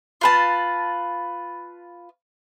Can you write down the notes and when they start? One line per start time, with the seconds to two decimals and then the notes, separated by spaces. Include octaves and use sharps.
0.21 F4 B4 A5